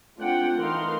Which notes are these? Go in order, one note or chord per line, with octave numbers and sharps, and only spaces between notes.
A3 C4 D4 F4 F#5 G5
E3 A3 D#4 A#4 F5 C6